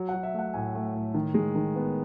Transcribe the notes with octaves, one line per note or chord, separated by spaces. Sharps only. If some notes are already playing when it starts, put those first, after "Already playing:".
Already playing: F#3
F#5
F#3
E5
A3 F#5
A2 G#5
A3
A2
D#3
G#3
D#3
B3